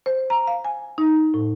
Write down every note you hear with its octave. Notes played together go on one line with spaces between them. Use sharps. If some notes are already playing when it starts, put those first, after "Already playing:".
C5
A#5
F5
G#5
D#4
A2